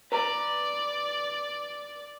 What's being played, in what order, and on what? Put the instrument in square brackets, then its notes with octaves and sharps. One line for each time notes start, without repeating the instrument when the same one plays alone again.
[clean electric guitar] B4 A#5 [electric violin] D5